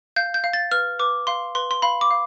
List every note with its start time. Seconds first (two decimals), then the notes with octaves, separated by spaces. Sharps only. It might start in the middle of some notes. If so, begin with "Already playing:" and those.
0.16 F5 G6
0.34 G6
0.44 F5
0.53 A6
0.71 B4 F6
0.99 B4 D6
1.27 F5 C6
1.55 B4 C6
1.71 C6
1.82 F5 B5
2.01 D6
2.11 F5